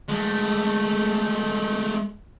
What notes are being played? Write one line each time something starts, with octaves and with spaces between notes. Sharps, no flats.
G#3 A3